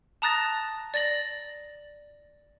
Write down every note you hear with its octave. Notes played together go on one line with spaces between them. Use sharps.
A5 A#5 D#6 F#6 A6 A#6
D5 A6 A#6 F#7